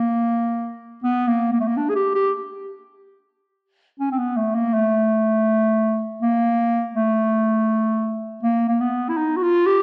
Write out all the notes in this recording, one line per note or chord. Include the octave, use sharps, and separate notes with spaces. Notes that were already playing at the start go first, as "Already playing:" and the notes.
Already playing: A#3
B3
A#3
A#3
A3
A#3
D4
G#4
G4
G4
C#4
C4
B3
A3
A#3
A3
A#3
A3
A#3
A#3
B3
E4
D#4
F#4
F4
G4